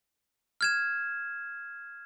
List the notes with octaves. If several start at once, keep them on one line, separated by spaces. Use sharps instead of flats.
F6 G#6 E7